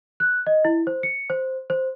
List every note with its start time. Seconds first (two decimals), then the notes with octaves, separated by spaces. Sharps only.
0.20 F#6
0.47 D#5
0.65 E4
0.87 C5
1.03 C#7
1.30 C5
1.70 C5